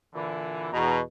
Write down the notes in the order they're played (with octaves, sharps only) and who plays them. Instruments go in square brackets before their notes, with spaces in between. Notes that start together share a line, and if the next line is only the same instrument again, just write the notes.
[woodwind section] A#2 D3 E3
[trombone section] E2 B2 [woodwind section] A#5